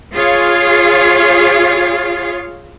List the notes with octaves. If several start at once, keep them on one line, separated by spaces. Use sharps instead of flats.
F4 G#4 C#5 F5